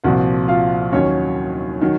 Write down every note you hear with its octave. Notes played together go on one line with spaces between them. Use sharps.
C2 A#2 F3 F#4 F#5
F4 F5
D#2 D#3 F#3 C#4 C#5
D#3 F#3